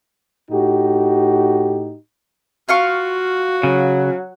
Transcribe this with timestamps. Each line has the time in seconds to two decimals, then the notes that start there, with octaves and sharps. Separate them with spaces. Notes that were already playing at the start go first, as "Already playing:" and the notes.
0.51 A2 D#4 F#4 G4
2.69 F4 F#4 F5 C#6
3.63 C#3 F#3